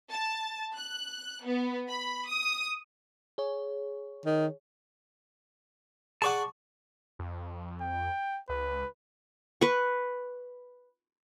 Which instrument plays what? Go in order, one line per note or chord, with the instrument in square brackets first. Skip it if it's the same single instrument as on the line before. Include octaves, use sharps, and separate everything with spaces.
[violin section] A5
F#6
B3
B5
D#6
[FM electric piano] G#4 C#5
[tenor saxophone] D#3
[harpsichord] G#4 D5 F#5 [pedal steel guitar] A5 C#6 D6
[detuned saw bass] F2
[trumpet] G5
[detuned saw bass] C#2 [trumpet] B4
[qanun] B4 C#6